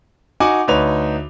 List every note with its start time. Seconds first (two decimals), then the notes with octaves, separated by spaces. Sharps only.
0.40 D#4 F#4 F#5 G#5 D6
0.68 D2 D#4 B4 C#5 F7